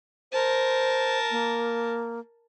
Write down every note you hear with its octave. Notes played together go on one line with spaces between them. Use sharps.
A#4 C5 A5
A#3